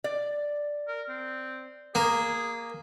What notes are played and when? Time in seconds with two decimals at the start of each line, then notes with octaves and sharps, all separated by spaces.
0.04 D5
0.88 A#4
1.09 C4
1.95 A#3 G#4